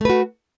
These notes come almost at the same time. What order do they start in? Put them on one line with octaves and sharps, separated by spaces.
A3 B4 F#4